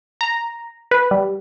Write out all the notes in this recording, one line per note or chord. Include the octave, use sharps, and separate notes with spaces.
A#5
B4
G3